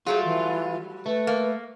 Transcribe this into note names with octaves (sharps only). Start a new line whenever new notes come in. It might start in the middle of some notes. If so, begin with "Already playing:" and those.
F#3 G3 A3 F4 G#4
E3
A3 B4
A#3